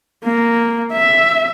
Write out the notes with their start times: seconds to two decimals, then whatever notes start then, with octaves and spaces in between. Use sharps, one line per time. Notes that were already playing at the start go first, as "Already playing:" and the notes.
0.25 A#3
0.92 E5